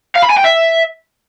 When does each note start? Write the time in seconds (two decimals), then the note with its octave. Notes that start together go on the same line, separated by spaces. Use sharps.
0.16 F5
0.23 B5
0.30 G#5
0.38 G5
0.45 E5